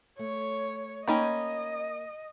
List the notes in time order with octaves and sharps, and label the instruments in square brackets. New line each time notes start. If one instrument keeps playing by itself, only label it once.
[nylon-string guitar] A3 [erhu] C#5
[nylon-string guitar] A#3 [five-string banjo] C#4 D#4 G5 [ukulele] C#5 A#5 B5 [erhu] D#5